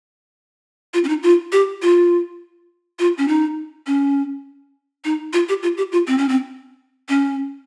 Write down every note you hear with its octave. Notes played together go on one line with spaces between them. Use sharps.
F4
C#4
D#4
F4
G4
F4
F4
C#4
D#4
C#4
D#4
F4
G4
F4
G4
F4
C4
C#4
C4
C#4